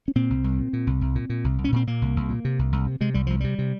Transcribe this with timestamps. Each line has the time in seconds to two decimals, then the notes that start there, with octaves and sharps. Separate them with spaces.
0.08 C#4
0.15 A#2 C4
0.30 C2
0.44 C2
0.59 A#2
0.73 A#2
0.87 C2
1.01 C2
1.15 A#2
1.30 A#2
1.44 C2
1.58 C2
1.64 C#4
1.72 A#2 C4
1.87 A#2 A#3
2.02 C2
2.16 C2
2.30 A#2
2.45 C3
2.59 C2
2.72 C2
2.87 C3
3.01 C3 G#3
3.14 C2 G3
3.27 C2 F3
3.40 C3 G3
3.59 C3